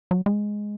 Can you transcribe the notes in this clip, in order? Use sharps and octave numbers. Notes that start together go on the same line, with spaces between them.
F#3
G#3